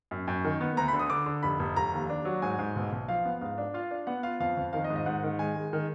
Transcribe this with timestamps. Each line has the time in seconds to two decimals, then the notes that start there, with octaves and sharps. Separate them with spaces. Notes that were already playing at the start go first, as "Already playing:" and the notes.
0.11 F#2
0.28 F#2
0.44 D#3
0.61 B3
0.77 D2 A#5
0.88 B5
0.93 D3
0.99 D#6
1.10 D3 D6
1.26 D3
1.43 F1 B5
1.59 F1
1.76 F1 A#5
1.93 D#2
2.09 D4
2.25 F#3
2.42 G#2 G#5
2.59 G#2
2.76 B1
2.92 B1
3.08 F3 F5
3.25 B3
3.41 G#2 F5
3.58 D4
3.74 F4 F5
3.91 D4
4.07 B3 F#5
4.23 F4 F5
4.40 F2 F5
4.57 F2
4.73 D#3 F5
4.84 D#5
4.90 G#2
4.96 D#5
5.06 G#2 F#5
5.23 D#3
5.39 G#3 G#5
5.56 G#3
5.73 D#3